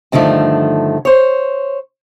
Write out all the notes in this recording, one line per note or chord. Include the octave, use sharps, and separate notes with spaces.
G2 D3 D#3 F3 A3
C5 C#5